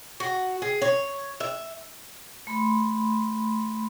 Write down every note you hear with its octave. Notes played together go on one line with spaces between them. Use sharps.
F#4
G#4
C#5
E5
A3 B5 C6